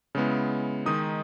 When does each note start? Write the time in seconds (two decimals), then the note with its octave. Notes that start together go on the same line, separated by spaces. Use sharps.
0.15 C#3 G#3 B3 E4
0.86 D#3 G#3 D#4 D#6